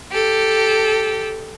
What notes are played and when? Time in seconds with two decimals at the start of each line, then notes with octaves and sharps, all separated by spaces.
0.11 G4 A4